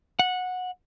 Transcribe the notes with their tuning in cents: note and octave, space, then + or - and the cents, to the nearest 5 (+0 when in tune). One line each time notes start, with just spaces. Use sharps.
F#5 -15